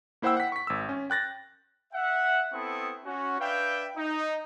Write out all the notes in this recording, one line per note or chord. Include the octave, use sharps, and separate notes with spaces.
A#3 E4 C5 F#5 G5 E6
F#5 B6
C#6 B6
G#1 E6
C#4
G5 F#6 A6 A#6
E5 F#5
B3 C4 E4 A4 C#6 D#6
C#4 F#4
D4 B4 E5 F5 G5
D#4